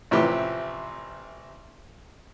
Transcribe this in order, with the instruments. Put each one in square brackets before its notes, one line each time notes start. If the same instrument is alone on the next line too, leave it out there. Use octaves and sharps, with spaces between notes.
[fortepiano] A1 A2 C3 F3 G4 B4